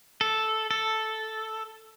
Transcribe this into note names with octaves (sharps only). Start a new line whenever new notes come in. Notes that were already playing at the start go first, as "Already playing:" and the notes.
A4
A4